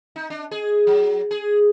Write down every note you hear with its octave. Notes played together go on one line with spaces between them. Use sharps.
D#4
D4
G#4
F#3
G#4